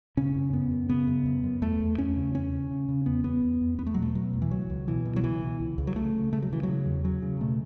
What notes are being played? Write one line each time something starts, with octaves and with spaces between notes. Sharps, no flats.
C#3 C#4
F#2
F#2 B3
F#2
C#3 B3
F#2
F#2
F#2
E2 A3
E2
E2 C#4
C#3
E2 C#4
C#3
C#3
C#3
E2 B3
E2 B3
E2
E2
E2 B3
A3
B2 F#3
A3
B2 F#3
E2
E3
C#2 F#3
C#2
B2 E3
B2
F#3
C#2 E3
B2
C#2
C#2
F#3
C#3 A3
C#3
C#3 A3
F#3
C#3 E3
F#3
C#3
E2
C#3 F#3
C#3
B2 A3